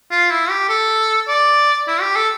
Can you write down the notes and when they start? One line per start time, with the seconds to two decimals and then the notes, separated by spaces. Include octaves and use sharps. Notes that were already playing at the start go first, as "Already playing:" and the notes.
0.11 F4
0.31 E4
0.50 G4
0.69 A4
1.28 D5
1.88 E4
2.01 G4
2.16 A4